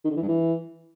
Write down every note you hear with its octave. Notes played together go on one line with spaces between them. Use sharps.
D#3
D3
E3
G2
E3